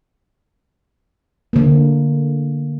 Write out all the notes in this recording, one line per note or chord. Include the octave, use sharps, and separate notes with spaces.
D3 A#3